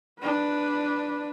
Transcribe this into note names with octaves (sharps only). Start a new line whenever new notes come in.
D4 B4